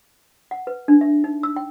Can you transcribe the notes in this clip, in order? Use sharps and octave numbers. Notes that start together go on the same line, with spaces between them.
F#5
B4
D4
E5
D#4
E6
G5